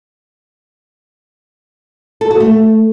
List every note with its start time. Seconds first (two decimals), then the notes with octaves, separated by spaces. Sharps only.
2.21 A4
2.31 F#4
2.40 A3